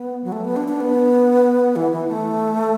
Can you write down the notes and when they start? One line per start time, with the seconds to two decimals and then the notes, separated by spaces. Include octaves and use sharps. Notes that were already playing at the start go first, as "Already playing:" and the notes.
Already playing: B3
0.24 F#3
0.32 A3
0.45 B3
0.56 D4
0.68 D4
0.81 B3
1.76 E3
1.92 E3
2.08 A3